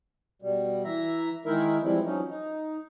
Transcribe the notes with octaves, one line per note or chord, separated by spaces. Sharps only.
B2 G3
E3 E5 A#5
D#3 G#3 D#4 E4 A#4 E5
E3 F3 G3 G#3 C4 E4
F3 F#3 C#4 D#4
D#4